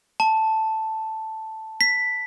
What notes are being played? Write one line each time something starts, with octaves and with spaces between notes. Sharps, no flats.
A5
B6